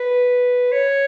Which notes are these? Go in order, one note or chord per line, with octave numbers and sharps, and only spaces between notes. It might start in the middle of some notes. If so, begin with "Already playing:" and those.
Already playing: B4
C#5